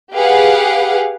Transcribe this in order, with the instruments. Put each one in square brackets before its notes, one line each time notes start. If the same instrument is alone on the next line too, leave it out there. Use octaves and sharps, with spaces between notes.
[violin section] G4 G#4 B4 F5 F#5